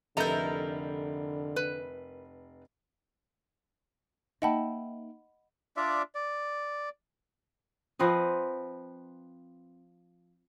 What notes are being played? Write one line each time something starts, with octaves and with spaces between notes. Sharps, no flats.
F1 D3 E4 A4 A#4 D#5 A#5 G6
B4
A#3 D#4 D#5 E5 F#5 G5 A5 B5
D4 F4 D5 E5
D5
F3 C4 B4 D#5